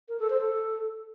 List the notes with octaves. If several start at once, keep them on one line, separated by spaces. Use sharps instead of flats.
A#4
A4
C5
A4